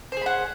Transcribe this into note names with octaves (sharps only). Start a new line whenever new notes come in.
G#4 C5 F#5 B5